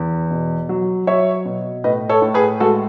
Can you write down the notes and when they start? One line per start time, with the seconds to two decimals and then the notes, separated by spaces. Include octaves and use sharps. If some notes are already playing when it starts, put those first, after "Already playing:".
Already playing: E2
0.31 B2
0.69 F#3
1.07 F#3 C#5 E5
1.45 B2
1.84 A2 B4 D#5
2.09 A4 C#5
2.22 A2
2.34 G#4 B4
2.60 G#3 F#4 A4